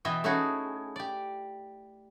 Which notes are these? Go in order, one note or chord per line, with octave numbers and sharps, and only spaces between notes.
B2 E3 E4 D#5 E5 G5
A3 C#4 D#4 E4 F#4 G#4
G4 D5